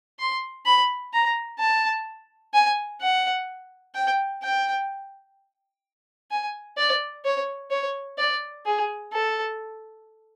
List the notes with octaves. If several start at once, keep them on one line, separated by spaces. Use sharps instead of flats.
C6
B5
A#5
A5
G#5
F#5
G5
G5
G#5
D5
C#5
C#5
D5
G#4
A4